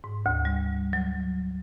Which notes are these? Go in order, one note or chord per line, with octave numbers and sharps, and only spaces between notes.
G#2
D2
G3
F#3